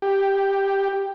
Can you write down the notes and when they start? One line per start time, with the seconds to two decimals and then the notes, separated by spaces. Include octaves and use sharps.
0.02 G4